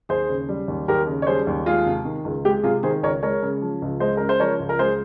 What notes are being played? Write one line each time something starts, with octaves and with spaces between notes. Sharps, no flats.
D#2 G#4 C5
C#3
G3
D#2
D#2 G4 A#4
C#3
C#5
G3 G#4 C5
D#2
G#3 F4 G#4
C3
D#3
C#2
G#3 G4
C3 F4 G#4
D#3 G#4 C5
C#2 A#4 C#5
G#3 A#4 C#5
C#3
F3
C#2
G#3 C5 D#5
C#3 A#4
C5
F3 A#4 C#5
C#2
A#4
G#3 G#4 C5